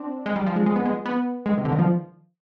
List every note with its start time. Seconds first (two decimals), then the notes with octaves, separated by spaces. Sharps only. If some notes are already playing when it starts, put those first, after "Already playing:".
Already playing: C4 D4
0.26 G#3
0.36 G3
0.46 F3
0.56 G#3
0.66 G#3
0.76 B3
0.86 G#3
1.05 B3
1.46 G#3
1.58 C3
1.65 D3
1.72 D#3
1.79 F3